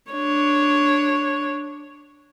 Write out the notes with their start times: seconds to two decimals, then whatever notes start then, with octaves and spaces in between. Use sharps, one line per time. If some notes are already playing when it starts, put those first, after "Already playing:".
0.12 D4 C#5